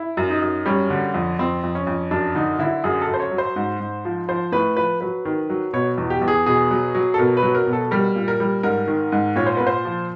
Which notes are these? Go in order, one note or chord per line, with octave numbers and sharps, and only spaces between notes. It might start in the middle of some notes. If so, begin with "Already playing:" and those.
Already playing: E4
F#2
D#4
F#2
G3 C#4
D3
F2
F2 C4
F2
C#4
F2
F#2 D4
D3 D#4
D3 E4
F#2 G#4
A4
F#2
C5
C#5
F#3
C5
G#2
G#2
F3
F3 C5
A2 B4
F3 B4
F#3 B4
D#3
F#3
B2 C#5
E2
G4
E2
G#4
B2 G#4
F#3
F#3
A4
B2 A#4
B4
F#3
A#4
B2
A4
G3 A#4
A#2
A#4
G3
G#2 A#4
D#3
G#2
A#2 C#5
C5
A#2 B4
C5
F3